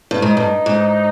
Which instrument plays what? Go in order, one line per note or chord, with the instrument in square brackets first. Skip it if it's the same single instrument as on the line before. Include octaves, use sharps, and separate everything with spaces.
[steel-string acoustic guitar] G2
[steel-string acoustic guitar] G#2 [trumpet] D#4
[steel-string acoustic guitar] G2
G#2